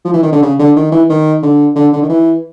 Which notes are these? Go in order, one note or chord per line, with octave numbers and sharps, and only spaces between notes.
F3
E3
D#3
D3
C#3
D3
D#3
E3
D#3
D3
D3
D3
D#3
E3